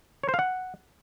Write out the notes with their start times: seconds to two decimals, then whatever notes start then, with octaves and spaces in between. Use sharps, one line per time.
0.23 C#5
0.29 C5
0.34 F5
0.39 F#5